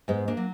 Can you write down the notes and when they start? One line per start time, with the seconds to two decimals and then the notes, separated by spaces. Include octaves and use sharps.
0.08 G#2 G#3 B3
0.28 A#3 D4
0.37 F#3